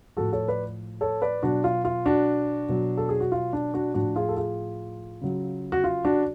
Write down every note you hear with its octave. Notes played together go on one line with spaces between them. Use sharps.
A2 F3 F#4 A4
A4 C#5
B4 D5
A4 C#5
B4 D5
B2 F#3 D4 F#4
F4
F4
D4 F#4
B2 F#3
A4
G#4
F#4
F4
D4
D4 F#4
A2 F3 D4 F#4
F4 G#4
A4
F4 G#4
C#3 F#3
F#4
F4
D4 F#4